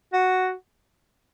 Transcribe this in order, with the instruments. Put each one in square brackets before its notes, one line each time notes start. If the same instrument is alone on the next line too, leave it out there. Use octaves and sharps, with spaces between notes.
[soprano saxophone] F#4